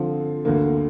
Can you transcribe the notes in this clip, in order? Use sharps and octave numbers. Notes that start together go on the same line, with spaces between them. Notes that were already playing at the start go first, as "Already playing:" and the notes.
Already playing: D3 F3 C4 F4
D2 D3 A#3